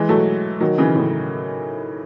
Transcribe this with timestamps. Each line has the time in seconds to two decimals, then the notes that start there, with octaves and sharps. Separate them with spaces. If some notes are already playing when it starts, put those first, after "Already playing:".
Already playing: E3 G#3
0.09 F#3 A3
0.60 D#3 F#3
0.78 C#3 E3
0.95 A2 C#3